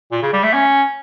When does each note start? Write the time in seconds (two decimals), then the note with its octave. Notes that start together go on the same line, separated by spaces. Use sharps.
0.12 A#2
0.22 C#3
0.33 G3
0.43 A3
0.53 C#4